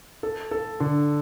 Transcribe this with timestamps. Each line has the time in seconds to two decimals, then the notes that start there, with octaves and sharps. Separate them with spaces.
0.23 A4
0.51 A4
0.80 D3